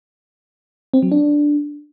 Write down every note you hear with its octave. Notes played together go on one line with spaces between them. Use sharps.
C4
F#3
D4